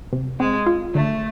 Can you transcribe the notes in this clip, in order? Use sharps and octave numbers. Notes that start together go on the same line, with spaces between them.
C3
G#3 C4
F4
D3 A3